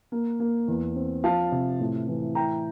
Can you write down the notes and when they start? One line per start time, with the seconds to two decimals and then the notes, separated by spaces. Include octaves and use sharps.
0.12 A#3
0.40 A#3
0.68 E2
0.95 C4
1.24 F3 F5 A5
1.52 C3
1.80 A2
2.08 E3
2.35 E4 G5 A#5